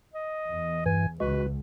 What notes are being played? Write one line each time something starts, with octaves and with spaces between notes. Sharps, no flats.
D#5
E2
G2 E3 G#5
C#2 G#3 F#4 B4